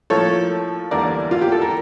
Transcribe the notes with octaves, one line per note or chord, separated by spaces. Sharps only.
A2 F3 A#3 A4 C#5
E2 D3 G3 A#3 A#4 D5
F4
G4
A4
A#4